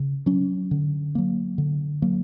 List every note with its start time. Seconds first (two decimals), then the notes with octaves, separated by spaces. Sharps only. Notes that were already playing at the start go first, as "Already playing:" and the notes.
Already playing: C#3
0.26 F#3 C#4
0.71 D3
1.15 F#3 A#3
1.58 D3
2.02 F#3 A#3